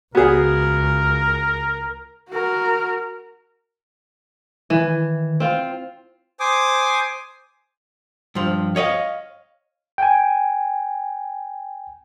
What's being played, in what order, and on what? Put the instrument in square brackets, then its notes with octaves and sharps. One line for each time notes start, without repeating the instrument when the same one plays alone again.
[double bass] C#2 [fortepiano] B3 G#4 [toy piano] F#4 [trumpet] A#4
[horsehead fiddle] F#4 A#4
[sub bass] D#3 [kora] E3
[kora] C4 F4
[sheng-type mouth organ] C5 G#5 D6 D#6
[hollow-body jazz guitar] G2 F3
C#5 D#5 F5
[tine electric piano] G5 G#5